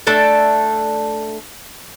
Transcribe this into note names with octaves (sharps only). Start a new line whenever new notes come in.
A3 D4 A4 E5